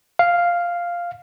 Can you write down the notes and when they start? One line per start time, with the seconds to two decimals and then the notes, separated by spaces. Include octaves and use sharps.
0.19 F5